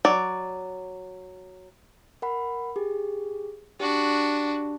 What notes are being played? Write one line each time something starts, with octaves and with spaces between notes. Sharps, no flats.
F#3 D5
A#4 F#5 B5
G4 G#4
D4 F#4 G4